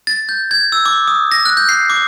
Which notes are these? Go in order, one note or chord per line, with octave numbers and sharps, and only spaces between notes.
A6
G6
G#6
E6
D6
D#6
A#6
F#6
G6
C7
D6